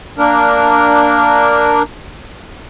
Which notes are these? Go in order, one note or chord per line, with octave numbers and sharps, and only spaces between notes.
A#3 D4 A#4